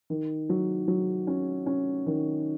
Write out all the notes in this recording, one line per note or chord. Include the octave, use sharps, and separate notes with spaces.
D#3
F#3
F#3
C#4
C#4
D#3